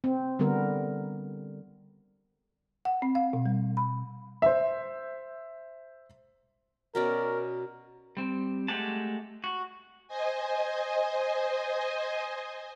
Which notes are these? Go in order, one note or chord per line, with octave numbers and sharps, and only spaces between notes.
C4
D3 G3 B3 A#4
F#5
C4
F5
B2
G3
B5
C5 E5
B2 C#4 A#4 D5
G3 C4
G#3 A3 G4 F#5 A5
F#4
C5 D#5 G#5